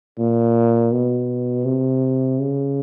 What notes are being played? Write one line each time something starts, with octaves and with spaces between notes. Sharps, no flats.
A#2
B2
C3
C#3